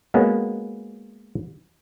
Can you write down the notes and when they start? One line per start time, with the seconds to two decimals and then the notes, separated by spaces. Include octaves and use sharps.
0.14 G#3 A#3 B3 C#4 F#4